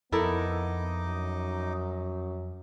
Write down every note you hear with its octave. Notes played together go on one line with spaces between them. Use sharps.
F2 B3 D#4 E4 A4 A#4 D#5 D6
F#2